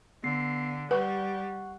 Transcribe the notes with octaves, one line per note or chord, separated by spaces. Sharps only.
D3 B3 C7
G3 B4 F#5 C#6 F#6